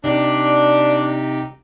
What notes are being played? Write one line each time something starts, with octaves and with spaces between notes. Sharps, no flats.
C3 D4 D#4 G4